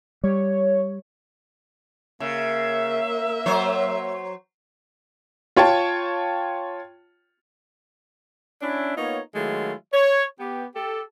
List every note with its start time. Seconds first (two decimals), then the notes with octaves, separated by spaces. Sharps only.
0.24 G3 C#5
2.20 C#3 A#3 E5
3.46 F#3 C5 C#5
5.56 F4 C#5 G5 A5
8.62 C#4 D4 E4
8.96 A#3 B3 D#4 F4 C#5
9.35 D#3 F#3 G#3 A3 E4 F4
9.93 C#5
10.40 B3 G4
10.76 G4 A4